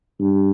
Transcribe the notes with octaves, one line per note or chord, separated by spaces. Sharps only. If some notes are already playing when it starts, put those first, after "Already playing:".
G2